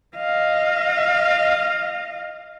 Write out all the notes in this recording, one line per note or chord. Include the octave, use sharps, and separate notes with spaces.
D#5 F5